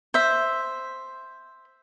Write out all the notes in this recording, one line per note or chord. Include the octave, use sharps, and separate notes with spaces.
C5 E5